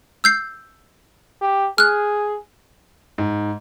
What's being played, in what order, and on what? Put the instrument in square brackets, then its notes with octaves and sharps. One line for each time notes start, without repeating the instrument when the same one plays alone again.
[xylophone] E6 G6 C7
[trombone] G4
[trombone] G#4 [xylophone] F6 F#6
[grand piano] G#2